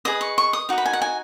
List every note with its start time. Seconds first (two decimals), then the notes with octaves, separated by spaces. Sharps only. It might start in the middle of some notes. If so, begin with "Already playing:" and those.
0.05 G#4 B4 D#5 D#6
0.21 C#6
0.38 C#6
0.53 D#6
0.69 D#4 F#4 D#5
0.78 B5
0.86 G#5
0.93 F#5
1.02 G#5